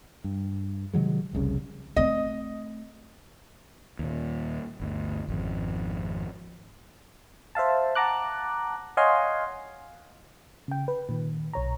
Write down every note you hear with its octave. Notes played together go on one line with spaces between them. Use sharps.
G2
C3 D#3 F#3 G#3
F1 C2 C#3
A3 C4 D#5
D#2 A#2
G1 D2
G#1 F2
C5 E5 F5 A5
F#5 A5 A#5 D6 F#6
C#5 D#5 F5 F#5 G#5 C6
C#3 G5
B4
A#2 D#3
B1 C#5 A#5